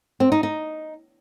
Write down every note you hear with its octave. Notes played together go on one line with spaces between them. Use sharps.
C4
D#4
D#4